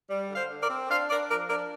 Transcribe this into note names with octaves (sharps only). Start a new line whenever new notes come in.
G3
D3
C5 F5
D3
A#4 D5
C4
D4 C5 F5
D4 A#4 D5
F3 A#4 D5
D4 A#4 D5